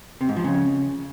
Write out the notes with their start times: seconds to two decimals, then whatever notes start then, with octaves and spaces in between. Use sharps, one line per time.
0.21 C3
0.29 G#2
0.36 F3
0.44 C#3